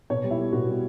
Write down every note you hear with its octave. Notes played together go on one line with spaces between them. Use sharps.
B2 C#5
G3
E4
G3
B2 F#4
G3